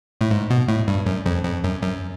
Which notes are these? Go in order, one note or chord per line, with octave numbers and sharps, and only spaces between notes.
A2
G#2
B2
A2
G2
F#2
F2
F2
F#2
F#2